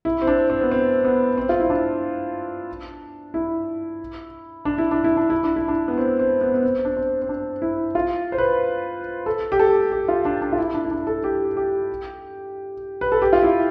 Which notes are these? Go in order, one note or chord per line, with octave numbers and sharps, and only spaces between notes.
E4
C4
D4
C4
B3
C4
B3
C4
F4
E4
D4
E4
D4
E4
D4
E4
D4
E4
D4
E4
D4
B3
C4
C4
B3
B3
C4
D4
C4
C4
D4
E4
F4
C5
B4
A4
G4
A4
G4
F4
D4
D4
F4
E4
D4
E4
D4
A4
G4
G4
B4
A4
G4
F4
E4